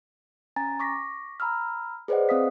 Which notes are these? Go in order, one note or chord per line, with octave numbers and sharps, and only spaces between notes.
C#4 G#5 A#5 A6
C#6 D6 A#6 B6
A#5 B5 E6 F6
G#4 B4 C5 D5 D#5 F#5
C4 F5 D#6 B6